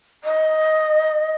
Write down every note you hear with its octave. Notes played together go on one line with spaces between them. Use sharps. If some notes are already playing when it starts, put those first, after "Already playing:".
D#5